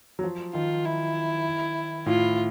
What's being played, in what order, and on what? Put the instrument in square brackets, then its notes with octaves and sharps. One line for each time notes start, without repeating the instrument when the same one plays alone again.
[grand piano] F#3
F3
[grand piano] D#3 [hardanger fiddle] F4
[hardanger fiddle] E4
[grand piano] A2 [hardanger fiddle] F4